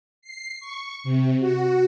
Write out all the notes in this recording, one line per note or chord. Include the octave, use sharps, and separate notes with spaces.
C7
C#6
C3
F#4